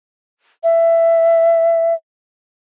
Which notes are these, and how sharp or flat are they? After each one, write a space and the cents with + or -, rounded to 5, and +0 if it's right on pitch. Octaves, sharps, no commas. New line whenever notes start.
E5 +15